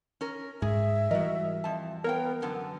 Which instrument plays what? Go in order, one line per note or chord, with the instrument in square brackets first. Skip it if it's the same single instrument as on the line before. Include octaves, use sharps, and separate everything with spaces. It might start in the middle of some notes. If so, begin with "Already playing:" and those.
[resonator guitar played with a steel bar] C#4 A#4
[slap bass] G#2 [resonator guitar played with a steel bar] G#4 [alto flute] E5
[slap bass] E3 G3 [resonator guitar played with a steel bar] F#4 A#4 [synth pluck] D#5
[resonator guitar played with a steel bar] F2 A5
[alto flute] B3 [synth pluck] A#4 [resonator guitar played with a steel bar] C#5 F5 G5
[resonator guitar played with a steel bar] F#2 D3 B3 [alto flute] A5